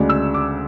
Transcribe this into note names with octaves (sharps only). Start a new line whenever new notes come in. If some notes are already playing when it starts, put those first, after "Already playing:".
Already playing: D2 C#3 G#3 D4
E6
D6